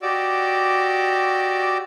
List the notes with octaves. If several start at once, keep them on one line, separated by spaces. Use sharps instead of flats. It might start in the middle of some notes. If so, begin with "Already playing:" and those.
F#4 G4 D5 D#5 D6 E6